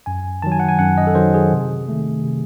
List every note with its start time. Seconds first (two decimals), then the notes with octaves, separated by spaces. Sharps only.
0.06 F#2 G#5
0.42 D#3 F#3 A5
0.52 G#5
0.60 F#5
0.69 G#5
0.79 F#2 F#5
0.98 D#5
1.07 A4
1.15 D#3 F#3 C5
1.34 G#4
1.52 C3
1.88 D#3 A3
2.24 C3